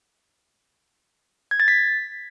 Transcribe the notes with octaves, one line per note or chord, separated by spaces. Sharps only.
G#6
A6
B6